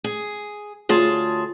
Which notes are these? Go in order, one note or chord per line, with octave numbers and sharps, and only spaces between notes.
G#4
D2 F4 G#4 C#5 A5